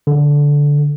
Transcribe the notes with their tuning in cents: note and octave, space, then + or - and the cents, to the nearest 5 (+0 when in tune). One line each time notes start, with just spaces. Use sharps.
D3 -15